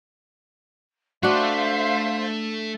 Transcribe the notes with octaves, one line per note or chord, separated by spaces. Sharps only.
A3 D4 F#4 A4 C5 E5 F5